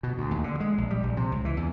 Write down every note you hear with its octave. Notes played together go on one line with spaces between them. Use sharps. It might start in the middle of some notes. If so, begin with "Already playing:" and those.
B2
D2
D#2
D3
G#3
A#1
G3
A#1
C3
C#2
E3
E2